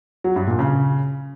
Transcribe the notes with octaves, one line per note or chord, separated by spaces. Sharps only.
F#3
G2
A#2
C#3